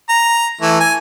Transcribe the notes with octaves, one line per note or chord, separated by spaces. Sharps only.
A#5
E3 A3
G#5